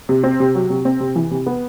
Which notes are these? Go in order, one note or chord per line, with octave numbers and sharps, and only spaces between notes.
C3
C4
C3
F#3
C3
C4
C3
E3
C3
B3